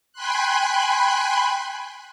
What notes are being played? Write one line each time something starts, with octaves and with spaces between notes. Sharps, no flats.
G5 G#5 B5 C6 F#6